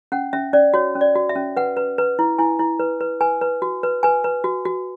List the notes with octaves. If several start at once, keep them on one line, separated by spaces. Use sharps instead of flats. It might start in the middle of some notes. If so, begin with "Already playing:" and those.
C#4 F#5
C#4 E5
C#4 D5
F#4 C#5
C#4
D5
F#4
E5
C#4
B4 F#5
B4
B4
E4
E4 G#5
E4
B4
B4
B4 G#5
B4
F#4
B4
B4 G#5
B4
F#4
F#4